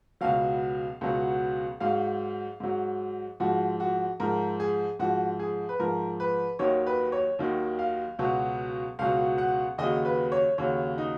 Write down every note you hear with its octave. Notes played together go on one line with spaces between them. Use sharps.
C#2 B2 F#3 F5
C#2 B2 F#3
G#2 F#3 F5
G#2 F#3
G#2 F3 F#4
F#4
G#2 F3 A#4
G#4
G#2 F3 F#4
G#4
B4
G#2 F3 A#4
B4
D#2 D#3 F#3 C#5
B4
C#5
D#2 D#3 F#3
F5
C#2 B2 F#3
C#2 B2 F#3 F5
F#5
D#2 C#3 F#3 D#5
B4
C#5
D#2 C#3 F#3 C#5
D#4